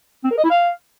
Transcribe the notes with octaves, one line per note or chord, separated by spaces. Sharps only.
C4
A#4
D#5
E4
F5